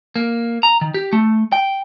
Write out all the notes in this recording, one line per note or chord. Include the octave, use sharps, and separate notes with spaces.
A#3
A#5
D#3
G4
A3
G5